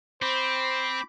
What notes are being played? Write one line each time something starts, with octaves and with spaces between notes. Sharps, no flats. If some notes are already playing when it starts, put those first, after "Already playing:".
C4 C5 B5 D6